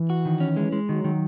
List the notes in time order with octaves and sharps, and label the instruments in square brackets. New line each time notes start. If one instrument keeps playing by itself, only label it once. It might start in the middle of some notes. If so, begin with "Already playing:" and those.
Already playing: [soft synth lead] E3
[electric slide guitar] F#4
D#3
C#4
G#3
G#3
[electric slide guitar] D#3 [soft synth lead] F#3
[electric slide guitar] D#3